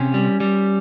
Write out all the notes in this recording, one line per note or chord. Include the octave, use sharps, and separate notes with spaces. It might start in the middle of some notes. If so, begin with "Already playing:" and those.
Already playing: C3 C#4
G3
G3